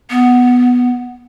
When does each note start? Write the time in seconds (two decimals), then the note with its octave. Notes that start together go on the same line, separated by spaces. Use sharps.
0.10 B3